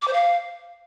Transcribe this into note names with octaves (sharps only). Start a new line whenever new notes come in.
D6
C5
F5